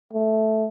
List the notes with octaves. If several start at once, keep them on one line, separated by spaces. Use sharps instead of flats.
A3